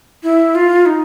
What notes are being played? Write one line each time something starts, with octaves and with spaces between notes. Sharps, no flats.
E4
F4
D#4